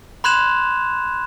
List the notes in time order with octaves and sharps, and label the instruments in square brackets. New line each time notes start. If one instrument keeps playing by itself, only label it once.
[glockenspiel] B5 C6 F#6 G#6 E7 F7